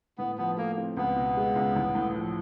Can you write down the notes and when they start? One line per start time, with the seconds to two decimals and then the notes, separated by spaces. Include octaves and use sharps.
0.18 A2 B3
0.38 F3 B3
0.57 A3 A#3
0.78 C4
0.97 C#2 B3
1.16 B2
1.37 G#3
1.55 C#2
1.76 A1
1.95 A2
2.15 F3